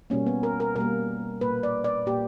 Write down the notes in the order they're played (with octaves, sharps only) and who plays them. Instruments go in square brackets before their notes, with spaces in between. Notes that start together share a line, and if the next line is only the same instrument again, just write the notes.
[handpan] B2 G3 A#3 C#4
B3
A#4
A#4
B2 G3 A#3 A#4
A#2 A#3 B4
D5
D5
A#2 A#3 G4